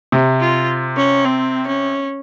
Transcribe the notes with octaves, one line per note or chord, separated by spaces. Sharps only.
C3
F4
C#4
C4
C#4